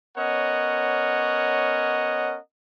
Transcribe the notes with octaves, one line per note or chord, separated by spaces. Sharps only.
B3 C#4 A#4 C#5 D#5 F#5